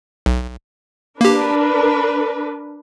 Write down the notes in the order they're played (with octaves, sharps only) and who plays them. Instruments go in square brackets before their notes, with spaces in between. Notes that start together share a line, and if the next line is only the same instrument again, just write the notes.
[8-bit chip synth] B1
[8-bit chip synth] A#3 G4 [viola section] D4 A#4 B4